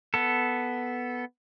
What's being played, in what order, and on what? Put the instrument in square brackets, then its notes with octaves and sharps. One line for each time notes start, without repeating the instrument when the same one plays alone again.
[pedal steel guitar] B3 A4